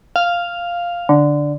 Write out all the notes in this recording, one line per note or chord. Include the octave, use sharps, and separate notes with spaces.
F5
D3